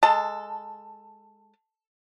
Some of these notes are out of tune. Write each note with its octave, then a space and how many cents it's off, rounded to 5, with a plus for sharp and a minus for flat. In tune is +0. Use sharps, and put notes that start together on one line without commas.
G#3 +0 A4 +5 A5 +30